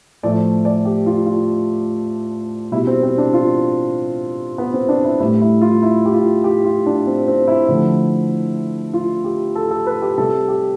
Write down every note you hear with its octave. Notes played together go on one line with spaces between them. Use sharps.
A2 F3 A3 D5
D5
G4
F4
F4
B2 G3 E4
C4
C4
D4
F4
B3
C4
D4
E4
A2 G3 E4
E4
F4
E4
G4
F4
G4
F4
D4
C4
C4
E4
D3 F3 A3
F4
G4
A4
A4
B4
G4
C3 G3 A4
G4